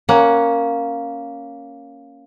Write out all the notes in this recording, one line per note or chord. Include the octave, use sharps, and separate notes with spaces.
A#3 C#4 F#5